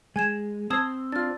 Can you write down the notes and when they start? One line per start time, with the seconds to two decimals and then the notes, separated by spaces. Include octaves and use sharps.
0.16 G#3 G#5 G#6 E7
0.70 C4 C5 A5 D#6 E6 G#6
1.12 D4 F4 F6 A6